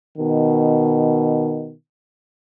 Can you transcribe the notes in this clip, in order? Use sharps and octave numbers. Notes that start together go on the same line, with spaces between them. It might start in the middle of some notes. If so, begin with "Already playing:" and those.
B2 D#3